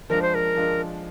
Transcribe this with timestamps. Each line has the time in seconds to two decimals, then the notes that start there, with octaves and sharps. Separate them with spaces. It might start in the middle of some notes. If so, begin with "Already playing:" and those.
0.10 F3 G#3 D4 F4 A#4
0.22 C5
0.35 A#4
0.55 F3 G#3 D4 F4